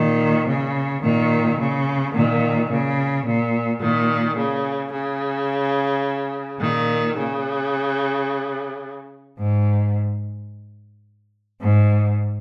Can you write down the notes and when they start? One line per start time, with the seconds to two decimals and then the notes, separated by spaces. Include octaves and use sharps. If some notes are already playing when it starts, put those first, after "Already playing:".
Already playing: A#2 D#3
0.47 C#3
1.03 A#2 D#3
1.58 C#3
2.14 A#2 D#3
2.70 C#3
3.26 A#2
3.81 A#2 D#3
4.36 C#3
4.92 C#3
6.60 A#2 D#3
7.16 C#3
9.38 G#2
11.61 G#2